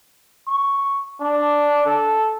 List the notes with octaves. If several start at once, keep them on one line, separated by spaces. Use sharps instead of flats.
C#6
D4
A4